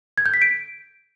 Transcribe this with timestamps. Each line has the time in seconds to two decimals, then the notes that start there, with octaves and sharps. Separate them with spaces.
0.18 G#6
0.26 G6
0.34 B6
0.42 D7